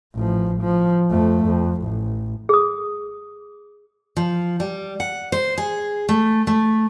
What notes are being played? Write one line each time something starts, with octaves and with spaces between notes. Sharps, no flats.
A1 F3
F3
F2 A3
F2
A1
G#4 D#6
F3
G3
F#5
C5
G#4
A3
A3